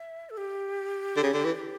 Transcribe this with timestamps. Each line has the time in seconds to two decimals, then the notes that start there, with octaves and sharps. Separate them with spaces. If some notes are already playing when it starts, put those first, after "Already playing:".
Already playing: E5
0.30 A4
0.37 G4
1.17 D3
1.23 C#3
1.34 D3
1.45 E3